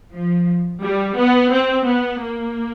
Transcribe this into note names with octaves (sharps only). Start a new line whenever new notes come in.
F3
G3
B3
C4
B3
A#3